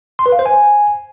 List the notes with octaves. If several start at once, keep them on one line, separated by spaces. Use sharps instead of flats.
C6
B4
F5
C5
G#5